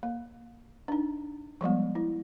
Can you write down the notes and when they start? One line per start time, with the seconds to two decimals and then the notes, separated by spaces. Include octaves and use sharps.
0.03 A#3
0.88 D4 D#4
1.61 F3 G3 G#3 B3
1.95 E4